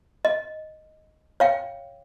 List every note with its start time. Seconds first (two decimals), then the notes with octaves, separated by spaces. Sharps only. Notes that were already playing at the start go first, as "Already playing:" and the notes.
0.25 D#5
1.40 C#5 F5 G5